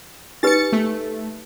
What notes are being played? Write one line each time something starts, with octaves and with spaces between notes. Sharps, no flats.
D#4 G4 B4 A6 C#7
A3